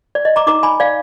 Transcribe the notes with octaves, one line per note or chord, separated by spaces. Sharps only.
D5
D#5
A#5 D6
D#4 A#4 A#5 D6
G#5 B5
D5 F5